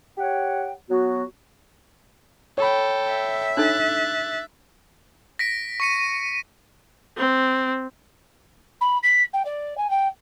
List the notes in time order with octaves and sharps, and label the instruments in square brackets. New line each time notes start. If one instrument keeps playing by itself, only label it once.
[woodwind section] G4 C#5 F#5 G5
F#3 B3 F#4
[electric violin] A4 G5 [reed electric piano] C#5 B5
[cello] E5
[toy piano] D4 D#4 A4 [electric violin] F#6 A6
[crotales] A#6 B6 D7
C#6 C#7 D#7
[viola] C4
[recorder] B5
B6
G5
D5
G#5
G5